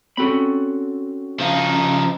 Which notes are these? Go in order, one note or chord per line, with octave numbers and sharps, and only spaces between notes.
C4 C#4 F#4 A4 B5
C#3 F3 D#4 F5